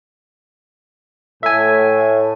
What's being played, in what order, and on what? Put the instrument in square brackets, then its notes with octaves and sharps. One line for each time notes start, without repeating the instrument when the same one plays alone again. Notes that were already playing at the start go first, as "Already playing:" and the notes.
[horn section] A2 [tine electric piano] E5 G#5